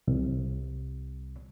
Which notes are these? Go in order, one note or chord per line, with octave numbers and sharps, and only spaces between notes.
C2